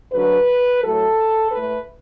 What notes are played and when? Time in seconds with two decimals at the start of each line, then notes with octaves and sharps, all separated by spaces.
0.12 D2 D3 F#3 B4
0.82 A2 F#3 A3 A4
1.51 A2 B4
1.56 A3